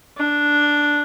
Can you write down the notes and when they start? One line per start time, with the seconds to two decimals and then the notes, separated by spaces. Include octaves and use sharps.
0.17 D4